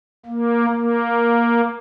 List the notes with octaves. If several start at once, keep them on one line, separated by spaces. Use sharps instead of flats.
A#3
A#3